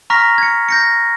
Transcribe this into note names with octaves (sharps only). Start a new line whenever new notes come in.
A#5 C#6 F6 A#6 B6
G#6 C#7
G6 A#6 C#7